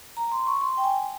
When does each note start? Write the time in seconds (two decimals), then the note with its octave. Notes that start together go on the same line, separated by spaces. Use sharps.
0.17 A#5
0.32 C6
0.47 C#6
0.61 C6
0.77 G5
0.84 G#5